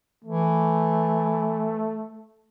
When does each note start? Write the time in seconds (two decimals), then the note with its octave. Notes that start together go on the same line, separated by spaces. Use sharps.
0.24 E3 A3